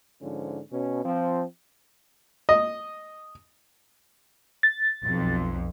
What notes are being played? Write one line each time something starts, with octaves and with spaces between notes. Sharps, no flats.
G#2 D3 F3 C#4
B2 C#4
F3 C4
D#5
A6
B1 F2